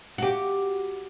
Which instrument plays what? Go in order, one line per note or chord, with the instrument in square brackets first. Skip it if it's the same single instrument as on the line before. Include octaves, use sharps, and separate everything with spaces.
[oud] F#4 G4